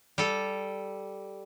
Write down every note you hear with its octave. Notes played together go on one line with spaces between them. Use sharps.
G3 A4